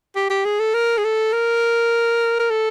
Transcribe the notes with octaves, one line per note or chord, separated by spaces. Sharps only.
G4
G4
G#4
A4
A#4
G#4
A4
A#4
A#4
A4